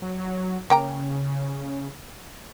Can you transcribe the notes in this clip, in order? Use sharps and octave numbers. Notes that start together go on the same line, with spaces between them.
F#3
C#3 A#3 G5 A#5